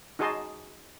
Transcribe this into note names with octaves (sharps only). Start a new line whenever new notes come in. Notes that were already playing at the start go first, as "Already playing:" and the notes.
D#4 F#4 G#4 D#5 A5 C6